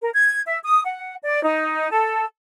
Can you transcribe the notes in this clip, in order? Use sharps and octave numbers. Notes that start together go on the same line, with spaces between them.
A#4
G#6
E5
D#6
F#5
D5
D#4
A4